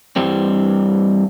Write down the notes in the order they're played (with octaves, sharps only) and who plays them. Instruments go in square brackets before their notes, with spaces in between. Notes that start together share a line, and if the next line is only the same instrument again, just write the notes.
[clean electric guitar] G2 E3 G3 C4